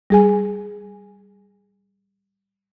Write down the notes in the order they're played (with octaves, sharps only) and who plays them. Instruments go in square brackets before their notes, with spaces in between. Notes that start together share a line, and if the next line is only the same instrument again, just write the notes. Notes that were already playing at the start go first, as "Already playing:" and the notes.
[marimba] G3 G#4 G#5